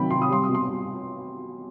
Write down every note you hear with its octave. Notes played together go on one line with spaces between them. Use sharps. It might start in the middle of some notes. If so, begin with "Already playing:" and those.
Already playing: C3 D#3 F#3 G5 B5
C3 C6
D#6
G3 C6
D#6
B2
C6
G3